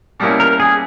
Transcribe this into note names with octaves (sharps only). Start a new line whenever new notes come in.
B2 G3 A#3 C#4 E4
A#4
G#4